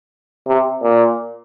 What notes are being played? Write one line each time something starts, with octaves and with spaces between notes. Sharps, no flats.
C3
A#2